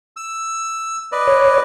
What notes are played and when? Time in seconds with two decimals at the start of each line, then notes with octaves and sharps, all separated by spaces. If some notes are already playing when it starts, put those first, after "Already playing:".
0.16 E6
1.12 B4 D5 D#5
1.27 C#5